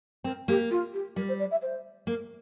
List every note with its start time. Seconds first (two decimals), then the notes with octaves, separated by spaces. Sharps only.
0.24 C4 A#4
0.48 A#3 G4
0.70 F4
0.93 G4
1.16 G3 A#4
1.28 C5
1.39 D5
1.51 E5
1.62 C5
2.07 A#3 A#4